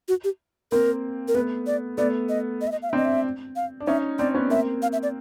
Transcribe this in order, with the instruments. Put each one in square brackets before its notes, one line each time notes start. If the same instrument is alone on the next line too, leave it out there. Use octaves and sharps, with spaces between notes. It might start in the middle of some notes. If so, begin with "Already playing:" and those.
[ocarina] F#4
G4
[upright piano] A#3 C4 [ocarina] A#4
[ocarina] A#4
[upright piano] A3 B3 [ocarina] B4
[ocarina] D5
[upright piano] A3 B3 [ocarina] D5
[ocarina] D#5
D#5
E5
D#5
F5
E5
[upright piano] C4 D4 [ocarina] D#5
[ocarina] E5
F5
[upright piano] D4
[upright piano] C#4 D#4 [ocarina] E5
[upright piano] C4 D4 [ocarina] D5
[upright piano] B3 C#4
[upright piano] A#3 C4 [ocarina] E5
[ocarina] F5
E5
D5